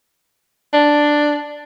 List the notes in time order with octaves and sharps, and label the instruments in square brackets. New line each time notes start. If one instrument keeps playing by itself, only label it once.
[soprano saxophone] D4